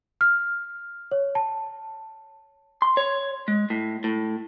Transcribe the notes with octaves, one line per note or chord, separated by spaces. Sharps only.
F6
C#5
A5
C6
C#5
G#3
A2
A2